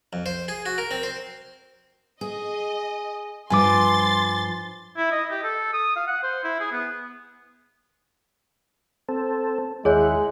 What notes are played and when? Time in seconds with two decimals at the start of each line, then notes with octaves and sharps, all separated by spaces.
0.13 F2
0.26 C5
0.48 G#4
0.66 F#4
0.78 A#4
0.91 C4
1.03 C5
2.21 G#4 D#5
3.50 G2 F3 G#5 C6 D6 A6
4.97 E4
5.12 D#5
5.31 G4
5.43 A4
5.73 D#6
5.96 F5
6.07 F#5
6.23 C5
6.44 E4
6.60 G#4
6.72 B3
9.09 C4 A4
9.85 D#2 G#3 E4 G#4 C#5 F#5